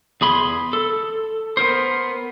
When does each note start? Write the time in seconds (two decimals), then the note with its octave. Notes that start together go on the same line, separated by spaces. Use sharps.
0.21 E2 G#4 B5 C6
0.73 A4
1.57 B3 A#4 C5